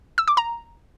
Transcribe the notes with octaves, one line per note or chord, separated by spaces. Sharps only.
E6
D6
A#5